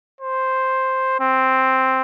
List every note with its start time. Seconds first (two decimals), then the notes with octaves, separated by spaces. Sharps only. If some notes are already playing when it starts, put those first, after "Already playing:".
0.21 C5
1.21 C4